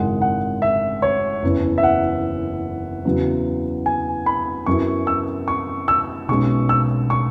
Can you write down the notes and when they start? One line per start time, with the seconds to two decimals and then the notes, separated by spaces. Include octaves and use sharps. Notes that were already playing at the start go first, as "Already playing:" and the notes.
Already playing: G#1 F#2 C#3 G#3 E4 F#5
0.21 F#5
0.62 E5
1.02 C#5
1.43 F#1 E2 E3 C#4 E4
1.78 E5
1.83 F#5
3.05 E2 C#3 F#3
3.86 G#5
4.26 B5
4.66 F#2 F#3 B3 E4 C#6
5.07 E6
5.48 C#6
5.88 E6
6.28 B1 B2 G#3 C#4 C#6
6.69 E6
7.10 C#6